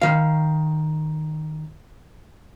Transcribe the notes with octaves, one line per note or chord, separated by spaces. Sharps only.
D#3 F5